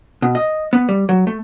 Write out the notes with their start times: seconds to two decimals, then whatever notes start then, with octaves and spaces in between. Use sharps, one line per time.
0.22 B2
0.35 D#5
0.73 B3
0.89 G3
1.09 F#3
1.27 A3